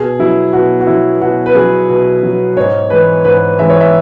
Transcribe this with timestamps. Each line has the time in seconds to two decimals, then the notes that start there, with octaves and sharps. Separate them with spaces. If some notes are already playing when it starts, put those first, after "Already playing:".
Already playing: B2 G#4
0.19 F#3 E4
0.53 B2 F#4
0.81 F#4
0.87 F#3 E4
1.21 B2 F#4
1.46 B4
1.55 F#3 G#4
1.89 B2
2.23 F#3
2.57 G#2 C#5
2.90 E3 G#3 B4
3.24 G#2 B4
3.58 E3 G#3 E5
3.70 C#5
3.80 E5